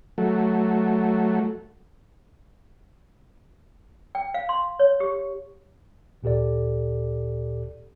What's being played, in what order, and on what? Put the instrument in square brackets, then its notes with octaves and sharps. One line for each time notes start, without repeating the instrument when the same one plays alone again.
[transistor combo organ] F#3 A3
[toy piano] G5
F5
C6
C#5
G4
[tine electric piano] D2 A#2 G4 A4 D5